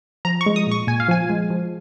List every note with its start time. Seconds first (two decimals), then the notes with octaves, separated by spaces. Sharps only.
0.25 F3 A#5
0.41 C#6
0.46 G#3
0.56 D#6
0.67 A#2 C#6
0.87 A#2 G#5
1.00 F5
1.08 F3 G#5
1.29 G#3
1.50 F3